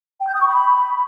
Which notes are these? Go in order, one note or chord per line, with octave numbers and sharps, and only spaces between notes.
G5
G6
D#6
C#6
B5